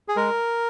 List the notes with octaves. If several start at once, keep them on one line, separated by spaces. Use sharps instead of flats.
G#4
G#3 A#4